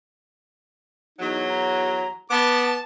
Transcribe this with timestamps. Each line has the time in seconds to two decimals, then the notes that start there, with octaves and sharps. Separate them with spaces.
1.19 E2 F#3 D#4
1.50 A#5
2.30 B3 A5 D6